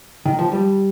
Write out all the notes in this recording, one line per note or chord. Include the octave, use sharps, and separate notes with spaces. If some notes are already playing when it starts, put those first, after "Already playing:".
D#3
F3
G3